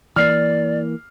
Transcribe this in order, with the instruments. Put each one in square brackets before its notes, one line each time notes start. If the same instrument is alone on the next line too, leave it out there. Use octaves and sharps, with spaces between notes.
[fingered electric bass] E3 A#3 [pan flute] D5 [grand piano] F6 C7